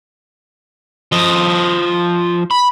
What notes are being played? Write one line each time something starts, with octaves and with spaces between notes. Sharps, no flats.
F3 D#5
B5